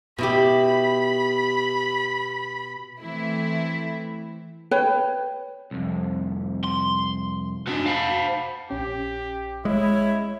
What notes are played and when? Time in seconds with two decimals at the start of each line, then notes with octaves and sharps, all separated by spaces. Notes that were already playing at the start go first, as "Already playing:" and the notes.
0.18 B2 E4 G4 B5
3.00 E3 A3 C4 E4
4.71 B4 C#5 G5
5.71 C2 F2
6.64 C6
7.67 B3 D4 D#4 F#4 G#5
7.86 C5 F5 F#5 A5 B5
8.70 A#1 C#4 G4
9.65 G#3 E4 C#5